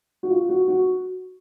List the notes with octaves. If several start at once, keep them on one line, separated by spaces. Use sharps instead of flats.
F#4
F4
F#4
F#4